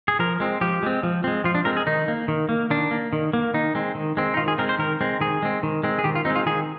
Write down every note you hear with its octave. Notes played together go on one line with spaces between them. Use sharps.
G#4
F3 A#4
G#3 C4
F3 G4
G#3 C4
F3
G#3 C4
F3 F4
D4
G#3 C4 A#4
G#4
D#3 D#4
A#3
D#3
A#3
D#3 D4
A#3
D#3
A#3
D#3 D#4
G#3 C4
D#3
G#3 C4
D#4
D#3 F4
G#4
G#3 C4 A#4
C5
D#3 A#4
G#3 C4
D#3 G#4
G#3 C4
D#3
G#3 C4
G#4
D#3 G4
F4
G#3 C4 D#4
F4
D#3 G#4